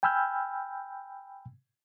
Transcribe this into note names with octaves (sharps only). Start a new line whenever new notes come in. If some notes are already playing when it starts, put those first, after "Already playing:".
G5 G#5 B5 E6 F6 G6